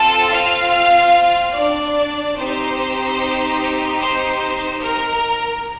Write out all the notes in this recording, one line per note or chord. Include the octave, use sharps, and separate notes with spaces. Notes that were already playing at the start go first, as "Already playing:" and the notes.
Already playing: C4 F4 A4 A5
F4 F5
D4 D5
C4 D#4 G4 C5
C5
A#4